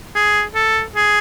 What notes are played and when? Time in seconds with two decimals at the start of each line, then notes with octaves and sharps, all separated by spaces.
0.16 G#4
0.55 A4
0.96 G#4